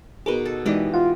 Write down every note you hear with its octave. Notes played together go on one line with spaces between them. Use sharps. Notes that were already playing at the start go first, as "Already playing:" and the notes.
B2 D#4 G#4 A#4 B4 D6
A4
E3 G#3 D#4 G4 D5 D#5
F4 F#5